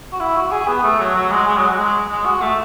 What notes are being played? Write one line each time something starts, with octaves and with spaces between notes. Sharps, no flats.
F#4
E4
F#4
G#4
B3
A3
F#3
F#3
G#3
G#3
F#3
F#3
G#3
G#3
F#4
A3